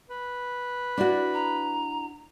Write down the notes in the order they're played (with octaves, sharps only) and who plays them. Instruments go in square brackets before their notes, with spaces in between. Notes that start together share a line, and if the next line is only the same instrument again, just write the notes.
[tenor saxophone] B4
[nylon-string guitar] D4 E4 F#4 [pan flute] D5
[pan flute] A#5